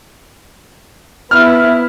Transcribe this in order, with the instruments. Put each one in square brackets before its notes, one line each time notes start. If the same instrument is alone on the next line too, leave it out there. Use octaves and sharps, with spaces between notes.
[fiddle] B3 E4 [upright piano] F6